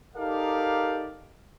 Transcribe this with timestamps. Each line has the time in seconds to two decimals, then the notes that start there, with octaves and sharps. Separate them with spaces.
0.15 D#4 G4 A4 A#4 D5 F5